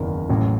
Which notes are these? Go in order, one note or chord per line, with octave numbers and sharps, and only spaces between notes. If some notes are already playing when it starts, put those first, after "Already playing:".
Already playing: F#1 E2 D#3
A1 A2 F#3